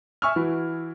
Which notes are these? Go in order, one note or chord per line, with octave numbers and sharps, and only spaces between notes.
E5 G#5 C#6 E6 F6
E3 E4 F#4